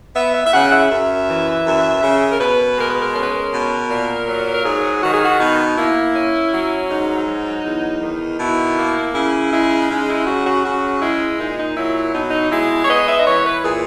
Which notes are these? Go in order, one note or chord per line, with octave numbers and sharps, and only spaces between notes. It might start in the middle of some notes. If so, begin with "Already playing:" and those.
B3 E5
E5
E5
C#3 F#5
E5
F#2 E5
E3
F#2
C#3
A#4
B2 B4
G#3 A#4
B4
A#4
C#4 A#4
B4
A#4
B2
A#2
F#3
A#4
G#2 G#4
D#3 F#4
G#4
F#4
B2 D#4
A#3 E4
C#4
F#3
G#2 D#4
F#3
E2
D#3
B2 E4
A#3
C#3 E4
G#3 E4
C#3 D#4
E4
F#3 F#4
F#4
C#3 F#4
G#3 E4
A#2 D#4
D#4
F#3 E4
B2 D#4
D#4
G#3 E4
C#5
B3 D#5
E5
D#5
E3 C#5
B4
A#2 G#4